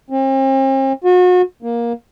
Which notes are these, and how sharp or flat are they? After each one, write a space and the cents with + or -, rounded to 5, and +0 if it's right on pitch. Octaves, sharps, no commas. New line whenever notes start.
C4 +45
F#4 -35
A#3 +15